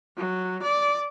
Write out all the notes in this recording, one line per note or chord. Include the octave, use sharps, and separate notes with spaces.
F#3
D5